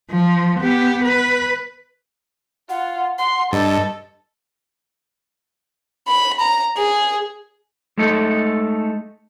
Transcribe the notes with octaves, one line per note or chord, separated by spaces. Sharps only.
F3
B3 G4
B4
F4 F#5
F#5 C6
G2 A4 D#5
B5
A#5
G#4
G#3 A3 D#4 A4